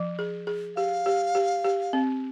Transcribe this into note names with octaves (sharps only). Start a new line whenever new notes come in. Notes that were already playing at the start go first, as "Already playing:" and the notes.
Already playing: F3
G#4
G#4
G4 F5
G4
G4
G4
C4